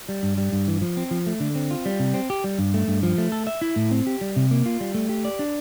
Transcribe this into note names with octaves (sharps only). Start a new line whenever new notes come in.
G3
G2
G3
G2
E3
F3
C4
F3
A3
D3
C4
F4
G3
C3
C4
G4
G3
G2
A3
G2
F3
A3
A4
E5
E4
A2
C4
G4
G3
C3
A#3
F4
G3
A3
G4
D5
D4